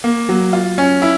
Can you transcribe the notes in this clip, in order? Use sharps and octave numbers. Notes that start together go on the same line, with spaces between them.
A#3
F#3
F4
C#4
E4